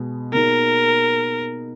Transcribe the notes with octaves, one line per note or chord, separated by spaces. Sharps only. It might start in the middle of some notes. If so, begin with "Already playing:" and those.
Already playing: B2 G#3 B3
B2 A#3 D#4 G#4 A#4